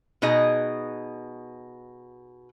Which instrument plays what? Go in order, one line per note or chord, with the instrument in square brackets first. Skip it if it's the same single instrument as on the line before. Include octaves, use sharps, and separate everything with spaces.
[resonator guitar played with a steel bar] B2 D#4 G#4 D#5